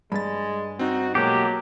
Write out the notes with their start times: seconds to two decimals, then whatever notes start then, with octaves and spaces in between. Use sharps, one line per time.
0.12 G2 G#3 B5 A6
0.79 C4 D#4 F#4
1.15 B2 F#3 G#3 A#3 G4